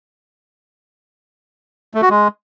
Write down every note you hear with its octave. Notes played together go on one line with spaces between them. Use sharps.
A3
F#4
G#3